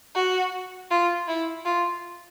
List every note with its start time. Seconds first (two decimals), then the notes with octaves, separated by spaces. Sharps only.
0.15 F#4
0.90 F4
1.28 E4
1.65 F4